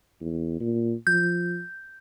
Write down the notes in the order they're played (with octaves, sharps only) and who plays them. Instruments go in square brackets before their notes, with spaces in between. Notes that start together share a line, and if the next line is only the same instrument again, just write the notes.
[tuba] E2
A#2
[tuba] F3 [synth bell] G6